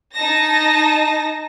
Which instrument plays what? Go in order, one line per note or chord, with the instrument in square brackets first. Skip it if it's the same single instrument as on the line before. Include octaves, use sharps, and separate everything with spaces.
[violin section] D#4 A5 A#6